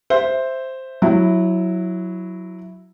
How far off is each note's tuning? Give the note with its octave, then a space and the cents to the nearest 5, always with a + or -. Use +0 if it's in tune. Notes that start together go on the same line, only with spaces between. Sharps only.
C5 +0 E5 +0
F#3 -10 E4 +0